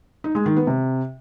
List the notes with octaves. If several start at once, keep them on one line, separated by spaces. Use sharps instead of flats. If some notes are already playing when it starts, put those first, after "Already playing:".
D#4
G#3
D#3
B3
C3